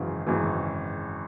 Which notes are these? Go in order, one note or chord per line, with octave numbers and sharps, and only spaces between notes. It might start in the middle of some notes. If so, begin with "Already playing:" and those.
Already playing: G#1 F#2 C#3 E3
G#1 F#2 C#3 E3